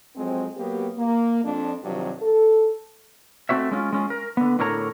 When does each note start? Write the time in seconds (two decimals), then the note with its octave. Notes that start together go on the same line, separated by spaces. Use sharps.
0.16 F2 F#3 G#3 C4
0.57 F#3 A#3 B3 G4
0.98 A#3
1.44 F2 D4
1.83 G2 C3 D#3 F3 F#3
2.21 A4
3.49 A3 C4 F#4 C#5 E5
3.71 G#3 C#4 D#4 F4
3.93 G#3 C#4 F4
4.10 A#4
4.37 D3 B3
4.59 A2 D3 A#4 C#5 A#5